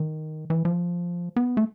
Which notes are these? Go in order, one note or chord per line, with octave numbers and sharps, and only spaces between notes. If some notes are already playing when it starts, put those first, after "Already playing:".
Already playing: D#3
E3
F3
B3
A3